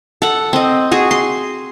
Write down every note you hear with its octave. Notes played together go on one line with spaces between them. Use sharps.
A4 F#5
C4 D#5
F#4 G#4
C6